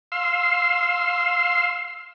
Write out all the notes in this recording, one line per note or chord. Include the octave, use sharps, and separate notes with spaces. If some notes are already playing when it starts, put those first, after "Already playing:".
F5 C6 E6